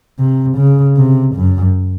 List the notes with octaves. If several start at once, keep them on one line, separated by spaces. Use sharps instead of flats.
C3
C#3
C3
F#2